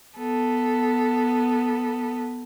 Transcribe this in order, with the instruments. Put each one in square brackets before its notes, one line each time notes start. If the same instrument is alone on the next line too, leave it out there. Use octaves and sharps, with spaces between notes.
[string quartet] B3 A4